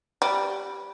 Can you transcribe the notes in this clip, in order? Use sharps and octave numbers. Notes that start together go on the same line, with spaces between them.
G3